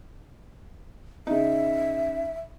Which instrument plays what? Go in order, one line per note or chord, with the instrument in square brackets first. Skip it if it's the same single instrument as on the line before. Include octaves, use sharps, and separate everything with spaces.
[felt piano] C#3 D#4 [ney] E5